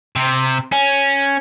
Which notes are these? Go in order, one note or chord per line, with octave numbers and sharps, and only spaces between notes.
C3
C#4